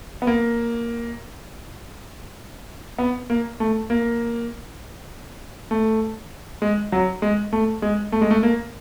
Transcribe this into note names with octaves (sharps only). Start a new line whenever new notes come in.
B3
A#3
B3
A#3
A3
A#3
A3
G#3
F#3
G#3
A3
G#3
A3
G#3
A3
A#3